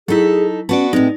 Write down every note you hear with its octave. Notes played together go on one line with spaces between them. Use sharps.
F#3 D#4 E4 G#4 A4
B3 C#4 F#4 D5 A5
A2 G#3 C4 D#4